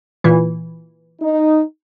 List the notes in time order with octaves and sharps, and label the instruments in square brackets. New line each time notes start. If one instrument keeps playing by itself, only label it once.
[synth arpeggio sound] A#2 E3
[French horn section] D#4